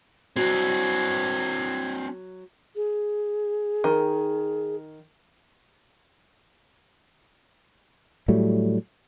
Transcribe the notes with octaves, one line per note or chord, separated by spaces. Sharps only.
F#3 C4 D4 G#6
G#4
D#3
A2 F#3 G3 A3